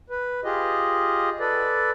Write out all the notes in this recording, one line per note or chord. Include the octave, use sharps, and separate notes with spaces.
B4
F4 G4 G#4 D#5
A4 B4 D5